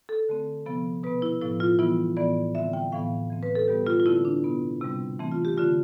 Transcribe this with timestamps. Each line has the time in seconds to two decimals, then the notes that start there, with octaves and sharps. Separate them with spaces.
0.09 A4
0.28 D3 A3 C4
0.66 C3 F3 B3
1.03 B2 B3 B4
1.22 E4
1.42 A2 F3 B3 E4
1.60 F4
1.79 E3 G3 B3 E4
2.17 A2 E3 B3 D5
2.55 D3 G3 C4 E5
2.73 G5
2.92 A2 E3 B3 F5
3.30 E3 A3 C4
3.43 B4
3.55 A4
3.68 B2 G3 B3 G4
3.87 F4
4.00 F4
4.06 D3 A3 C4 E4
4.25 D4
4.44 B2 B3
4.81 C3 G3 C4
5.19 E3 A3 C4
5.31 F4
5.45 G4
5.57 D3 A3 C4 F4